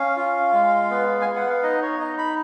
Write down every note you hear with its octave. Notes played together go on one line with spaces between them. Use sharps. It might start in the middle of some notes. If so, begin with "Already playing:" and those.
Already playing: C#4 F5
F4
G#3
B3
G#5
B3
F#5
F5
D#4 D#5
C#5
D#4 D#5
B5